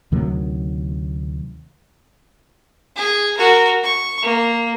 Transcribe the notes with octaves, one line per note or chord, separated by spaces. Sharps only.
D2 C3 D#3 F#3
G#4
F#4 A#4
C#6
A#3